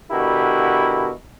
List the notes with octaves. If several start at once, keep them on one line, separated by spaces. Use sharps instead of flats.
B2 D3 E4 F#4 G4 A#4